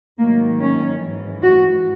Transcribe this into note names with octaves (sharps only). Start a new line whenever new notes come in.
G#2 D#3 F#3 A#3
C#4
G#2 E3
F#4